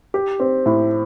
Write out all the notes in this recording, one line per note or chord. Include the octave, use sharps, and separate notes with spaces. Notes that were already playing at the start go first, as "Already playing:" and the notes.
G4
C4
A2